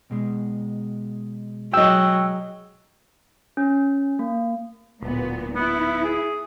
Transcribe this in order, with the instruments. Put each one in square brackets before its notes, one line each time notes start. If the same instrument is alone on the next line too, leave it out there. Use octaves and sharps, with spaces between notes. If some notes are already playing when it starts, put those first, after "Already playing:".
[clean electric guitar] B2 G#3
[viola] F#3 [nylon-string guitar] G#4 D#5 [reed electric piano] G5 E6
[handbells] C#4
A#3
[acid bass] D1 [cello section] A#2 B3
[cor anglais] B3 [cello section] E4
[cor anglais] G#4